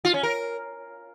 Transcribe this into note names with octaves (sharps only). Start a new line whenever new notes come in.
F4
C#4
A#4